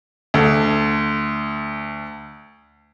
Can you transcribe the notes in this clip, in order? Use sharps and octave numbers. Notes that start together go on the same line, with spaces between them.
D2 A4